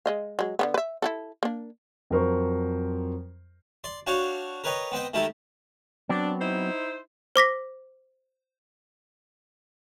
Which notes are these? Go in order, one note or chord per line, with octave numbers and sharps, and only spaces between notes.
G#3 D#5 F5
F#3 G#3
D3 E3 B3
B4 E5
E4 F#4 A4
A#3 D4
F2 F#3 A#4 C5 C#6
D5 C6
D4 F#4 C#5 F5 G5
A#4 B4 C#5 D#5 G5
B3 C4 D#5 G5
D#3 A3 D#4 E4 G4 A4
F#3 B3 C4 D4
D#4 E4 C5
C5 D6 A#6 B6